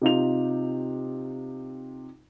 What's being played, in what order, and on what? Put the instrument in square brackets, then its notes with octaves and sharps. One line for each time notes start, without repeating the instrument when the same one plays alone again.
[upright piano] C3 D#4 F4 F7